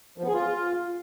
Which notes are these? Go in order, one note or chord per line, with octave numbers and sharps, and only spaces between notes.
F3
B3
G#4
F4